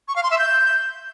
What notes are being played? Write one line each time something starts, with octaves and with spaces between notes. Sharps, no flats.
C#6
F5
C6
E5
G6